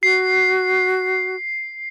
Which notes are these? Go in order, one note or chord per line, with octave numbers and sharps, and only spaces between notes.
F#4 C7